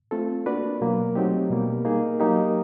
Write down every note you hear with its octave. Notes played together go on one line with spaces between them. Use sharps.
A3 C4 F4 A4
A#3 D4 F#4 B4 D5
B2 F#3 A#3
F#3 A3 C4 D#4 G4
B2 G3 A#3
A#3 D#4 G#4
F#3 A#3 D#4 G4